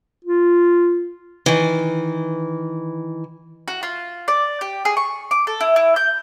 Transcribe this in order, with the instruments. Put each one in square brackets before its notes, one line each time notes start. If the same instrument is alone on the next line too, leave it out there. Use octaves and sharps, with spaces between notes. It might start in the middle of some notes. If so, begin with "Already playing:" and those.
[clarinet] F4
[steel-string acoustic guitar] D#3 E3
[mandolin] F#4
F4
D5
G4
G#4
C#6
D6
A4
E4
E4
G6